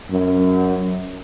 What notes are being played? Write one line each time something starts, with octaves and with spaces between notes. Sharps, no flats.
F#2